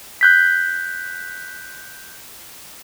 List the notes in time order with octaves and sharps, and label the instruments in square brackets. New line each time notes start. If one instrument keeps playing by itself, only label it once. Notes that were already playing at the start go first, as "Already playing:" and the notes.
[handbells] F#6 G6 B6